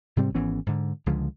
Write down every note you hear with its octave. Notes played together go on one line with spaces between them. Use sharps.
G#2 C3 G3 C4
G#1 E3 B3 C#4
G#2 D3
C#2 D3 F3 G#3